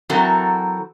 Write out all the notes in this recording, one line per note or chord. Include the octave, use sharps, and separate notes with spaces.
E3 F#3 C4 F#4 A4 A#4